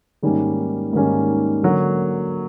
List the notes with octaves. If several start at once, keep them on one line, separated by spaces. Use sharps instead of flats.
G#2 D#3 G3 A#3 C#4
G#2 D#3 G3 A#3 C#4
D3 F#3 A#3